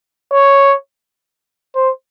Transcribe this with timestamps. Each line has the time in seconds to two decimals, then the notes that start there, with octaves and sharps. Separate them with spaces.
0.32 C#5
1.75 C5